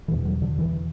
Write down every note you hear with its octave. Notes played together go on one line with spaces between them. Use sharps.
E2 B2 E3
F#3
D3
E3